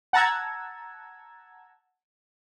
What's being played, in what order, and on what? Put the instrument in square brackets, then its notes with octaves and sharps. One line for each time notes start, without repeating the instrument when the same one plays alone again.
[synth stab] F#5 A5 A#5 E6 G#6